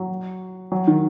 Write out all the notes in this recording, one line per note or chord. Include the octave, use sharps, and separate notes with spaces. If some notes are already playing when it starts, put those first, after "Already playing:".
Already playing: F#3
F#3
D#3